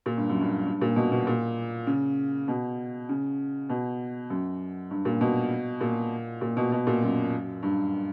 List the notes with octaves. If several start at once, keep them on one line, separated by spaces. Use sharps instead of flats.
A#2
G2
F#2
G2
G2
A#2
B2
B2
A#2
C#3
B2
C#3
B2
F#2
G2
A#2
B2
A#2
A#2
B2
B2
A#2
F#2
G2